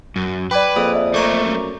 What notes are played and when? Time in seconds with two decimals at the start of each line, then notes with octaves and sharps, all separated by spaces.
0.16 F#2
0.51 B4 D5 G5 B5 D6 G#6
0.76 F2 A#3 G#4 D#6
0.95 D5 E5
1.14 A3 A#3 A#5 C#6 D6
1.44 F#2